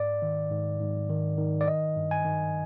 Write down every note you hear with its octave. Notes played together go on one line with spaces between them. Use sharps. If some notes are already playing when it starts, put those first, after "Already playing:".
Already playing: G#2 D5
D#3
G#2
G#2
D#3
D#3
D5
D#3 D#5
G2
G#5
D#3